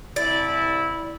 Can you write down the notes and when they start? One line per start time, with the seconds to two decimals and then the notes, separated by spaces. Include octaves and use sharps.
0.16 C2 E4 D5